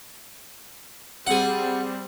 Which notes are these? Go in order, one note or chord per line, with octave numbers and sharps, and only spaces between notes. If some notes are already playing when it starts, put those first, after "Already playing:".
G3 C4 G#4 F#5